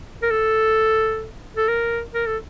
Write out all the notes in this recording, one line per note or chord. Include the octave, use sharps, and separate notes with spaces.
A#4
A4
A4
A#4
A#4
A4